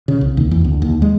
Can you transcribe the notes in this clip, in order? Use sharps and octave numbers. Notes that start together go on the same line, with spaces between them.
C#3
C2
D#2
E2
D2
D#2
G#3